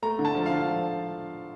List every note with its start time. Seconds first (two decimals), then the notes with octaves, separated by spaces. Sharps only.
0.02 A3 A#5
0.19 D3
0.25 A5
0.35 F3
0.46 F5
0.51 D3
0.68 F3